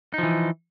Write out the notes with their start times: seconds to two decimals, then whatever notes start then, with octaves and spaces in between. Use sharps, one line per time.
0.14 D#4
0.18 F3
0.23 E3